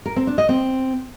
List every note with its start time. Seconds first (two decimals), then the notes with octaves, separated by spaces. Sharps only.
0.06 A#4
0.16 C4
0.27 D4
0.38 D#5
0.49 C4